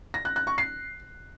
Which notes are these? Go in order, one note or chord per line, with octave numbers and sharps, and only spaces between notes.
A#6
F#6
F#6
C#6
C7